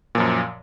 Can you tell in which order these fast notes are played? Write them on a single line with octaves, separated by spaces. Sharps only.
A#2 F3 F#2